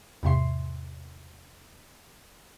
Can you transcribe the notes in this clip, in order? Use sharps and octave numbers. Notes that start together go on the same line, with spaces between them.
E2 G#2 C3 E5 C6 C7